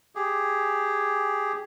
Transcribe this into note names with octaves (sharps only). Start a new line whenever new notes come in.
G4 G#4